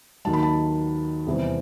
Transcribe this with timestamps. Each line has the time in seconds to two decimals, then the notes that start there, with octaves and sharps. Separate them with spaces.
0.25 D#2 D#3 F#3 A5
0.33 B5
0.43 A5
1.27 E2 C3 E3 G3 C4